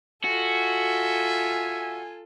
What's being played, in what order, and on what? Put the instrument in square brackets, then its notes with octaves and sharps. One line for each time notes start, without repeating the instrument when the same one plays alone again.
[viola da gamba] F4 A4 [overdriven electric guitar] F#4 [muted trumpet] E5 [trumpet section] G#5